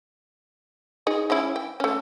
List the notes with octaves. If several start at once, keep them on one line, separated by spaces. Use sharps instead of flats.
D#4 G#4 D#5
G#3 C#4 E4
G5
A3 C#4